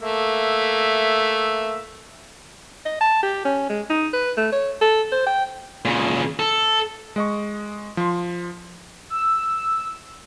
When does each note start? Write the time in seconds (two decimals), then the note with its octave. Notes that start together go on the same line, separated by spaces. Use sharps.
0.01 A3 A#3 E5
2.86 D#5
3.01 A5
3.23 G4
3.45 C#4
3.69 G#3
3.90 D#4
4.13 B4
4.37 A3
4.52 C#5
4.81 A4
5.12 C5
5.26 G5
5.85 A#2 C#3
6.39 A4
7.16 G#3 D#5 C#6
7.97 F3 C6
9.10 E6